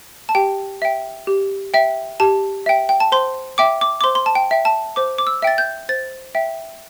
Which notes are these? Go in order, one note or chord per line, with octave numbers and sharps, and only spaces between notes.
A5
G4 G5
E5 G5
G4
E5 G5
G4 A5
E5 G5
G5
A5
C5 C6
E5 G5 D6
D6
D6
C5 C6
C6
A5
G5
E5 G5
A5
C5 D6
D6
E6
E5 G5 A6
G6
C5 A6
E5 G5